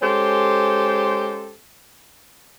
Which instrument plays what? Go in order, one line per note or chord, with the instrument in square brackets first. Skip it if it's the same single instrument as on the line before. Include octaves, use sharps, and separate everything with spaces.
[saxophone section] G#3 C#4 G4 A4 C5